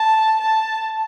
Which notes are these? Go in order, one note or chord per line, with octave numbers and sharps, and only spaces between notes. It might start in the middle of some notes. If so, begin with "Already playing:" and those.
Already playing: A5
A5